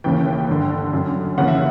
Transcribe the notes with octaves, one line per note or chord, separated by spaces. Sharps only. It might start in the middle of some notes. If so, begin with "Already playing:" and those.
D#2 C#3 E3 G5
G2 D3
F#2 D3
D#2 C#3 E3 F#5
E5